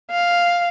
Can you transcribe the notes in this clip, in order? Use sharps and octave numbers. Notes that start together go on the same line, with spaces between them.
F5